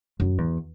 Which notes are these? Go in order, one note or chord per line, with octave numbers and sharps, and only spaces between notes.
F#2
E2